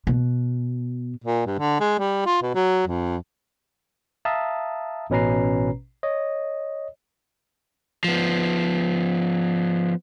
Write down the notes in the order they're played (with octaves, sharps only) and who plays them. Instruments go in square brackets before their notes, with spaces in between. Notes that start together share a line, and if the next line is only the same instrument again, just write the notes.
[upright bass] B2
[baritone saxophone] A#2
G2
D3
G#3
G3
F4
B2
F#3
F2
[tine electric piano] E5 F5 A5 A#5 D#6
A1 B2 C#4 B4 A#5 C7
C#5 D#5
[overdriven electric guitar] F3 B3